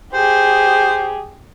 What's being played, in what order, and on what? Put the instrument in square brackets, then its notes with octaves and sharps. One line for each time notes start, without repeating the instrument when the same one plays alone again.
[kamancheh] G4 G#4 [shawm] C5